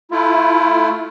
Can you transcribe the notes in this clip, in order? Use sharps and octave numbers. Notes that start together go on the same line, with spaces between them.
A3 E4 F4